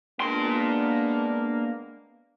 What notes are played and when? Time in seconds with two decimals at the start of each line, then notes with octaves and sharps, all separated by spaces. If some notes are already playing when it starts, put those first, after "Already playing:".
0.20 G#3 A#3 B3 D4 C6